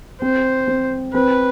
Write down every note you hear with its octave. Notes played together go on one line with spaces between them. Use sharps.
C4 C5
C4
C4 B4